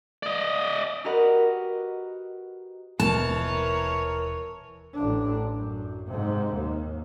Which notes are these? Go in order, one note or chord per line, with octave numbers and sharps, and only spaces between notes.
D5 D#5
F#4 G4 A#4 B4 D#5 F#5
D#1 B2 E3 A#4 C#5 A5
A1 D4
F#2
G#2 C3
D#2